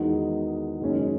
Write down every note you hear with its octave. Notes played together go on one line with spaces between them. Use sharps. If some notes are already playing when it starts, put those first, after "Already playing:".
Already playing: E2 D#3 G#3 D#4 F#4
F#1 F#2 D#3 G#3 C#4